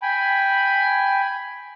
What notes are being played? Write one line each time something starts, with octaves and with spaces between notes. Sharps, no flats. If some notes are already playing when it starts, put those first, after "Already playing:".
G5 G#5 B5